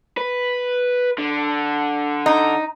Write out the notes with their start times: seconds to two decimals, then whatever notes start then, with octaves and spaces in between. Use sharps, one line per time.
0.17 B4
1.18 D3
2.26 D#4